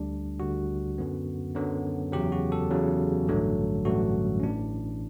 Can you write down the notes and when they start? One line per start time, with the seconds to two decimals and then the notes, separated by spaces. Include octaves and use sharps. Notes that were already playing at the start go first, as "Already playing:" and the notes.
Already playing: D2 D3 G3 D4
0.40 D2 D3 G3 F#4
0.98 F#2 D3 F#3 B3
1.55 F#2 D3 F#3 B3
2.12 E2 C#3 F#3 G4
2.32 F#4
2.52 A4
2.70 E2 C#3 F#3
3.28 A1 G2 D3 F#3 A3
3.85 A1 G2 D3 F#3 A3 F#4
4.40 C#4
4.43 A1 A2 E3 D4